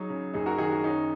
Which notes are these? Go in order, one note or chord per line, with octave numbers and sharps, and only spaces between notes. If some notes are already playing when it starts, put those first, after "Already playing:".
Already playing: F#3 D#4 G#4
C#3
F#1 D#4 G#4
F#4 A#4
D#3 D#4 G#4
F#4
C#4 D#4